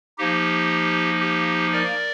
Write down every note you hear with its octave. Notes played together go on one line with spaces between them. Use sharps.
F3 A#3 D#4 G4
G4
A#4 D5